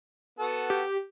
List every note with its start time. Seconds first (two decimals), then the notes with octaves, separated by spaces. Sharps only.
0.39 B3 F#4 A4
0.70 G4